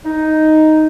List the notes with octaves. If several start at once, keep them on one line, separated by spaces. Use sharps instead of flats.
D#4